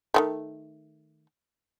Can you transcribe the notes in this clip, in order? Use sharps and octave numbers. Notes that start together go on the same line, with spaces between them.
D#3 F#3 A3